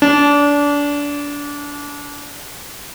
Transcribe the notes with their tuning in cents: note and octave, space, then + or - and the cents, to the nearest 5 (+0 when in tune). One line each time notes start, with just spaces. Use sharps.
D4 -25